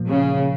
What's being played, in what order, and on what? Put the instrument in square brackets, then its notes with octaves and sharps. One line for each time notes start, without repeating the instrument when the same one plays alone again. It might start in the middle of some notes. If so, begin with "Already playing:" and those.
Already playing: [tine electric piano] A#2 F3 A#3
[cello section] C#3